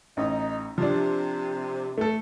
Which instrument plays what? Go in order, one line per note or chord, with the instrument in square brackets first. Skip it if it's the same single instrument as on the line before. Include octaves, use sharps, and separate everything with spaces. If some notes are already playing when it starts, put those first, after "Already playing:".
[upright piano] A1 [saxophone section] D#4
[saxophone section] C3 [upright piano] F3 D4
[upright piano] A3 A4